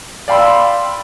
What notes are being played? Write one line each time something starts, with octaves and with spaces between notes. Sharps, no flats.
D5 F5 G5 B5 C6 E6